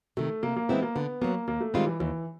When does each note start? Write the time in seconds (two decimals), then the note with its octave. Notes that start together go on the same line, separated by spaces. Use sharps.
0.17 C3 D#3 A3
0.43 C3 A#3
0.56 A#3
0.69 E3 G#3 B3 C4 E4
0.82 A#3
0.95 D3 B3
1.22 F#3 A#3 B3
1.48 D#2 A#3
1.60 A3
1.74 D#3 G3 G#3 C4 F4
1.87 E3
2.00 D#2 E3